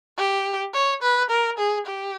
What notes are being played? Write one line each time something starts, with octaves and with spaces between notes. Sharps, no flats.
G4
C#5
B4
A#4
G#4
G4